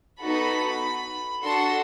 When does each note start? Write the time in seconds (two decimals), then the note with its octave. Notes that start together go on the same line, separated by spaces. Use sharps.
0.21 B3 D#4 F#4 A4 B5
1.43 D4 F#4 A4 C6